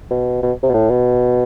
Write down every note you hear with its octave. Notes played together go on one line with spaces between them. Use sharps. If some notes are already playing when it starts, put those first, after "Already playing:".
B2
B2
C3
B2
A2
B2